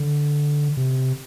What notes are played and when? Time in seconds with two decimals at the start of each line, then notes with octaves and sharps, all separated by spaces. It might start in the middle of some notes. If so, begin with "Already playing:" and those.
Already playing: D3
0.77 C3